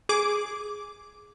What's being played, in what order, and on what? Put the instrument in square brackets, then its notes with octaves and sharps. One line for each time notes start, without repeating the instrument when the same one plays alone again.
[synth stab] G#4 D6